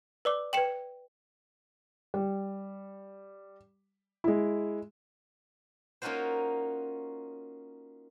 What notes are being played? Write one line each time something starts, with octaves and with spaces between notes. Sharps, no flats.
B4 D5 D6
B4 G5 C#7 E7 F#7
G3
G#3 E4
A#3 C#4 D#4 F4 F#4 C5